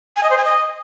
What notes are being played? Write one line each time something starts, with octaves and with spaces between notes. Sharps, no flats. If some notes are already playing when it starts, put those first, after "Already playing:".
G#5
D#5
C5
G#5
D#5